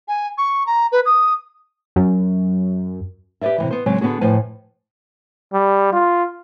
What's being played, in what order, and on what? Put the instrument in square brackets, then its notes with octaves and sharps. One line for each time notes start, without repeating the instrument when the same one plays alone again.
[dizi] G#5
C#6
A#5
B4
D#6
[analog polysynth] F#2
[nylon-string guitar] G4 B4 C#5 D5 E5
C3 D#3 E3
B3 C5
C#3 F#3 G#3 C4
D3 B3 D4 F#4 G#4
A2 F3 B4 G#5
[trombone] G3
F4